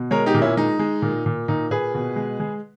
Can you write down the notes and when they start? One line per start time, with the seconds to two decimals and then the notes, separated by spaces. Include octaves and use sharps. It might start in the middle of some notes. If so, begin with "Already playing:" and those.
Already playing: B2
0.11 G#3 A#4 C#5
0.26 D#4 G4
0.34 A#2
0.42 C#4 E4
0.57 G#3 D#4
0.79 G#3
1.02 A#2
1.26 A#2
1.48 A#2 D#4
1.71 A#2 G#4 B4
1.95 B2
2.16 G#3
2.40 G#3